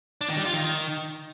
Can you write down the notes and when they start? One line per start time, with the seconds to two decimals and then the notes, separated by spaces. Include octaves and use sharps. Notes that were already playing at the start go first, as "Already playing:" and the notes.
0.21 D4
0.29 D#3
0.37 G3
0.45 F4
0.54 D#3